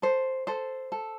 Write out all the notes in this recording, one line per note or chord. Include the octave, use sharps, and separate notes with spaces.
A4 C5
A4 C5
A4